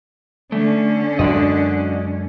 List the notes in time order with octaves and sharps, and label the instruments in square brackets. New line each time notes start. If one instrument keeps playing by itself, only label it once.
[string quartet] D3 C#4 [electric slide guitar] A3
[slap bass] F#2 G#3 [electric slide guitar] D4 F#4 D#5